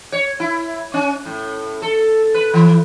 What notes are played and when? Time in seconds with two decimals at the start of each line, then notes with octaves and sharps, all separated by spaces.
0.12 C#5
0.40 E4
0.94 C#4
1.25 A2
1.82 A4
2.34 B4
2.54 E3